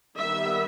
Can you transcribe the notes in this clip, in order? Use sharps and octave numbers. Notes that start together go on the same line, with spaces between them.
D#3 G3 B3 E5